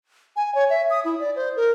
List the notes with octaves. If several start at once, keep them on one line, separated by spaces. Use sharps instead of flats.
G#5
C#5
E5
D#6
E4
D5
C5
A#4